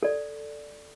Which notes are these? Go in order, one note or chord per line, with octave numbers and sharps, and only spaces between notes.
A4 D5